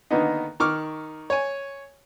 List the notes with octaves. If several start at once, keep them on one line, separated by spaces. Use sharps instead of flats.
D3 D#3 A#3 B3 D#4
D#3 C#6 D6 F6
C#5 G#5